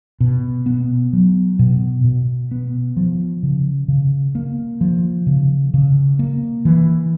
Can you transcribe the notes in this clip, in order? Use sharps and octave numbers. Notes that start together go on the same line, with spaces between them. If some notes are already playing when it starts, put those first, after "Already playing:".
B2
B3
F#3
B2
B2
B3
F3
C#3
C#3
A#3
F3
C#3
C#3
A#3
E3